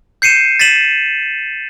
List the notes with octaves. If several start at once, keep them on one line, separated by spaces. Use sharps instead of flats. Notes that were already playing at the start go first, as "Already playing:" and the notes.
G6 C7 C#7 D#7 E7
A6 B6 D#7 E7 F#7